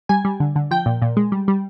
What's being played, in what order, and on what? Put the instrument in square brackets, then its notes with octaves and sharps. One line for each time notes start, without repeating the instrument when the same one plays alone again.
[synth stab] G3 G#5
G3
D3
D3
F3 G5
A#2
A#2
G#3
G3
G3